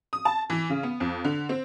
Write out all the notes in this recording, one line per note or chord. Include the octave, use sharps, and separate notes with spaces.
D#6
A5
E3
C#3
B3
F2
D3
C4